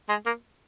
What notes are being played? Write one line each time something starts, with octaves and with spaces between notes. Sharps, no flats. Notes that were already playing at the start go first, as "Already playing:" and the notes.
G#3
A#3